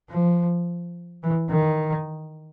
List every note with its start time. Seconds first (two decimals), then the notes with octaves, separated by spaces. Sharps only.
0.10 F3
1.23 E3
1.50 D#3